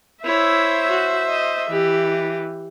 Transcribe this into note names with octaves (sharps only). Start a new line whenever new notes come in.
E4 C5 C#5 E5
F#4
D#5
E3 G4